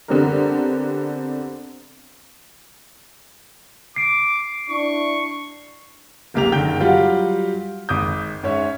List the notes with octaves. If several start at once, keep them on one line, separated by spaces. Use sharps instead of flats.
D3 B3 C4 D4 G4 A#4
D6 C7 D7
D4 E4 C#6
F#1 C2 A#3 G4 A#5 F7
F#1 D3 D#3 G5 G6 G7
F#3 G3 F4 G4 F5 F#5
G#1 D6 D#6 G6
G#2 C#4 C#5 E5